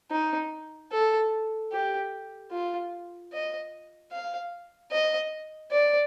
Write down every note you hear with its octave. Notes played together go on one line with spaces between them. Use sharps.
D#4
A4
G4
F4
D#5
F5
D#5
D5